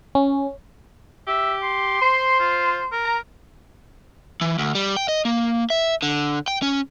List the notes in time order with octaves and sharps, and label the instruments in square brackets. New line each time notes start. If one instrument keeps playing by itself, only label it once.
[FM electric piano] C#4
[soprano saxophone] G4 [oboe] E5
[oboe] C6
[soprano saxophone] C5
[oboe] F4
A#4
[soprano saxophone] A#5
[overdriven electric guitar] E3
D2
G3
G5
D#5
A#3
E5
D3
G5
C#4